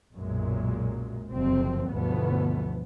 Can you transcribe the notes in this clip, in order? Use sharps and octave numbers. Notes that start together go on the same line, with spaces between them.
B1 F#2 A#2 G#3
F#1 F2 C3 C4
G1 D2 B2 E3 F3 B3